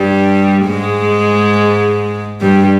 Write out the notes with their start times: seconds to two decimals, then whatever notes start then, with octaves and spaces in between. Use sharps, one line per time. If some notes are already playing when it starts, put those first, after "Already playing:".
Already playing: G2 G3
0.66 G#2 G#3
2.41 G2 G3